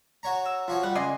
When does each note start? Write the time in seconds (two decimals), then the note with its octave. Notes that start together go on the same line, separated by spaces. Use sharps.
0.23 F#4 C#5 A#5
0.45 E6
0.68 F3 F4 F#4 C#5
0.83 G3 F#5
0.95 C#2 D5 D#5 G#5 C6